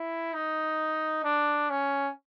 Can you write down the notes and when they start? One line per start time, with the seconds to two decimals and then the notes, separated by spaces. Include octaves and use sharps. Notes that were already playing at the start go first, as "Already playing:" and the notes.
Already playing: E4
0.33 D#4
1.24 D4
1.70 C#4